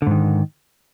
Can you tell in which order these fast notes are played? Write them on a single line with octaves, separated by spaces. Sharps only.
D3 G#2 D#3